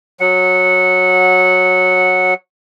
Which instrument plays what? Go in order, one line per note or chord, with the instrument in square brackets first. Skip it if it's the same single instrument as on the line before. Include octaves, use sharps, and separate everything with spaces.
[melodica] F#3 F#5